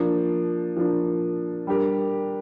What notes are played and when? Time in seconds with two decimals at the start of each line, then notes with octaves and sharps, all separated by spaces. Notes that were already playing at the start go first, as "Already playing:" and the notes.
Already playing: F3 A#3 D4
0.77 F3 A#3 D4
1.67 G3 D4 G4 A#4